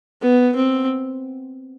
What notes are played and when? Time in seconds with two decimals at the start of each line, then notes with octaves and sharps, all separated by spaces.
0.22 B3
0.56 C4